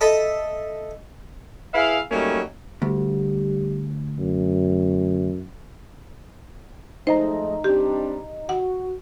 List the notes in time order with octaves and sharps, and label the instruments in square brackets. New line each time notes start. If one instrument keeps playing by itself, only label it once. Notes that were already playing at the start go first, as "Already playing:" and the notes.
[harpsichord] A4 D#5 E5 B5
[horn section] E4 G#4 B4 E5 F5
F#3 G3 A3 A#3 C#4 D#4
[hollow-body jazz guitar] D2 [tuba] G3
[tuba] F#2
[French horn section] F3 G#3 A3 [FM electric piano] D#4 D#5 A#5 [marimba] C5
[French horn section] G3 C4 D4 [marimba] G4
[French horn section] F#4 [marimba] F#5